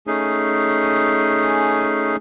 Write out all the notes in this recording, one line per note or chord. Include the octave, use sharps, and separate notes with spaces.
A3 C#4 D#4 G#4